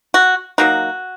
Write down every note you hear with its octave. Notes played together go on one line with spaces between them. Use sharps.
F#4
F#3 A#3 D#4 F#4